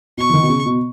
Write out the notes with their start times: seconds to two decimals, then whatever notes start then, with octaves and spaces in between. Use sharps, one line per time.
0.18 B2 C#6
0.29 E3
0.33 D#3
0.43 B2
0.49 C#3
0.66 B2